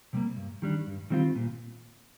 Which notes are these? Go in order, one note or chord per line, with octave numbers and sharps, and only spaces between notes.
C3 G3 A#3
G2
D#3 G3 D4
G2
D#3 G3 C4 F4
A#2